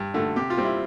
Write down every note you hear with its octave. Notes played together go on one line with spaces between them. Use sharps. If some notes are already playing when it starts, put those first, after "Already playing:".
Already playing: G2
D3 A3
C3 G4
F4
G3 C4
E4